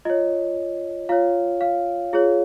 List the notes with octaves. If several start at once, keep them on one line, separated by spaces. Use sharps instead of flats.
F4 C#5 D#5
F4 C#5 F5
F5
F4 G#4 C#5